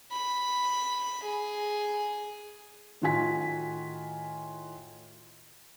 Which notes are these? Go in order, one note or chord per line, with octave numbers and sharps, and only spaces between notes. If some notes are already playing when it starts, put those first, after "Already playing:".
B5
G#4
A2 D#3 F4 F#4 G#5 B6